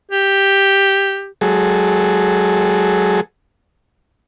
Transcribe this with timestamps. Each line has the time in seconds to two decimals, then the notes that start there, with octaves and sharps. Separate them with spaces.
0.12 G4
1.41 F#3 G#3 G#4 A4